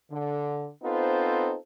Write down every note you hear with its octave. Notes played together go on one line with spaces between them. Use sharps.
D3
B3 C4 D#4 F4 A4 C5